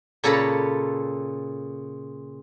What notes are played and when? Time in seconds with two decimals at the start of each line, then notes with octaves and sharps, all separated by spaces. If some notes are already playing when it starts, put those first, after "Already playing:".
0.24 A#2 C#3 A4 C#5 A#5 B5